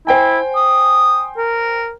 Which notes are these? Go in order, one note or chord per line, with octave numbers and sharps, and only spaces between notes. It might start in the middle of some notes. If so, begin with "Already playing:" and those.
E4 C5 G5 G#5
D#6
A#4